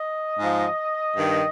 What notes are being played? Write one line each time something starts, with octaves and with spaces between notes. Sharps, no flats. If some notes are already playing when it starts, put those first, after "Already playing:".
Already playing: D#5
G#2 F3
G2 D#3